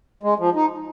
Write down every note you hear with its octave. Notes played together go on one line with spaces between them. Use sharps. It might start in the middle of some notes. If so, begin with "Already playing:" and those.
G#3
F3
D#4